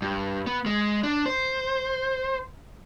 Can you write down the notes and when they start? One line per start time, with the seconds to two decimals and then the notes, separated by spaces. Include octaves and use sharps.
0.02 G2
0.47 B3
0.66 G#3
1.03 D4
1.26 C5